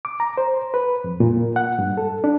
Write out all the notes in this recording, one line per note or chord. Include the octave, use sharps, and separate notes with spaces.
D6
A#5
C5
B4
F2
A#2
F#5
G2
A4
D4